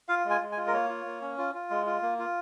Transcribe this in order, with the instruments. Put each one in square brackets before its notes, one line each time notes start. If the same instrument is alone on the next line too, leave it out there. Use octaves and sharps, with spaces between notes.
[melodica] F4 F5
G#3
G#5
G#3
G#5
F4
A#4
A#3 C#5
F4
A#3
C#4
F4
F4
G#3
F4
A#3
F4